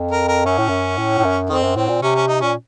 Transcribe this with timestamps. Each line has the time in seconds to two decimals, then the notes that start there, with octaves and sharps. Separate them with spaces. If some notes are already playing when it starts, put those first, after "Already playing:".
Already playing: F2
0.11 A#4
0.28 A#4
0.45 F#2 C#4
0.58 A2
0.69 F#2
0.98 A2
1.18 A2
1.24 F#2
1.49 F2 D#3 C4
1.63 F#2
1.76 A2 C4
1.89 A#2
2.02 C3 C#4
2.15 C#4
2.28 D#4
2.41 A#2 C#4